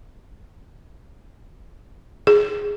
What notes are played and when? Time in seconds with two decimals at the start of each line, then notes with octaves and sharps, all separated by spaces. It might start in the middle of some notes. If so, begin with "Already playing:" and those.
2.27 G#4